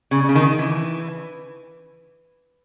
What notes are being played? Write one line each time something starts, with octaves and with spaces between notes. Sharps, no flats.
C#3
C#3
D#3
E3